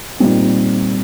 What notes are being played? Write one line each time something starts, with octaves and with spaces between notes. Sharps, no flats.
A#2 G3 C4 D#4